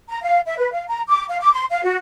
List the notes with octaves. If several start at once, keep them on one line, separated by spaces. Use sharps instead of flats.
A#5
F5
E5
B4
F5
A#5
D6
F5
D6
C6
F5
F#4